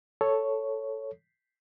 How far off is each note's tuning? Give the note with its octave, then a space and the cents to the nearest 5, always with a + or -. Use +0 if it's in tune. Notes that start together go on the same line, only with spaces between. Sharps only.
A4 +0 C#5 +0